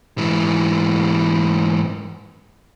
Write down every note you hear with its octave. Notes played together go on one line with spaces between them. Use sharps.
G#2 E3